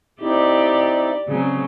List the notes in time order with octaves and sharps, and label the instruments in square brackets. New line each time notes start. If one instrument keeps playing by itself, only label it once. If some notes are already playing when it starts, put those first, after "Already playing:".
[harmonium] C4 D#4 E4 [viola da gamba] G4 D5
[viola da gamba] C#3 F#3 C4